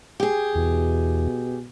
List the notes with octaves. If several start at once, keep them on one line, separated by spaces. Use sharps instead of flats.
G4 G#4
E2 B2